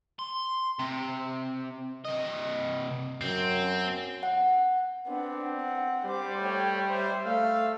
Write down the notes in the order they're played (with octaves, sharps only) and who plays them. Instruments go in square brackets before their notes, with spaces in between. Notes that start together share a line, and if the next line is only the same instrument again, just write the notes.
[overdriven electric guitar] C6
C3
C3 D#5
[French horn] F#2 [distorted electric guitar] C4
[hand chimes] F#5
[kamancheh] B3 D4 [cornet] C4
[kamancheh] F#5
[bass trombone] G3 [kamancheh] C5 D6
[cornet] A3 [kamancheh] C#5 G5
[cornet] C5 [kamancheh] E5
[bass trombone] A3 [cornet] F5 [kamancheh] E6